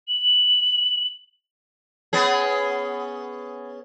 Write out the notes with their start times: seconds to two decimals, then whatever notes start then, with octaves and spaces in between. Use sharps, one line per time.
0.08 F#7
2.13 B3 C#4 G#4